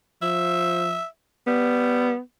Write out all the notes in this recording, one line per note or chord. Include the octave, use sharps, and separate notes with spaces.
F3 E5
G3 B3